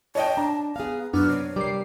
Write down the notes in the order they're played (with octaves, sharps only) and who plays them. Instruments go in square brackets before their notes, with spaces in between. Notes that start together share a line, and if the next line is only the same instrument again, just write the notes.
[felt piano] C#5 D#5 G5 [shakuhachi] A5
[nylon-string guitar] D4 [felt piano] A#5
[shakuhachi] B3 [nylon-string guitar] G#4 F5
[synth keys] F#2 D4 F6 [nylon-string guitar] B3 [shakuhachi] F#4
[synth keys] C3 [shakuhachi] C#5
[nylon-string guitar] G3 A#4 [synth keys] D6 C7